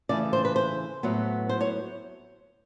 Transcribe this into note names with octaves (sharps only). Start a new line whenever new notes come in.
C#3 E3 A3 D5
C5
B4
C5
A2 F#3 B3
C5
C#5